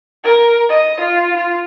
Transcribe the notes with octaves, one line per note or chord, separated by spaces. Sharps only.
A#4
D#5
F4
F4